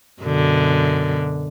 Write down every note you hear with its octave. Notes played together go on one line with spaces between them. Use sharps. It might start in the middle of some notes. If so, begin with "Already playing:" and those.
F#2 B2 D3